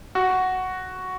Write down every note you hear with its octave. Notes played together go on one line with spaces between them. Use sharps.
F#4